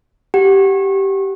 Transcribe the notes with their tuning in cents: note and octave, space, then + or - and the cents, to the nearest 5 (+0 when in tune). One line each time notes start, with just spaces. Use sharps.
G4 -10 F#5 +0